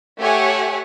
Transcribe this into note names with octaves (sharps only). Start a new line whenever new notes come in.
A3 G4 C#5 E5 F#5 G#5